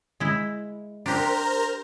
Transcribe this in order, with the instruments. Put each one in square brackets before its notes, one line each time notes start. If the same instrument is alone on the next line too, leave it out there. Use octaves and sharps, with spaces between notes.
[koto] G#3 E4
[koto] D4 G4 [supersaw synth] A#4 C5 A#5